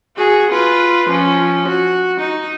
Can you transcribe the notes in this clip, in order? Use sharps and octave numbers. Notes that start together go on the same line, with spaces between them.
F#4 G#4
F4 B4
F3 C#4
F#4
D#4